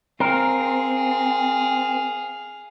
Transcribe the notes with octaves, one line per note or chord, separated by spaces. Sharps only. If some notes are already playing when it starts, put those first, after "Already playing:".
C4 G#4 A#4 F5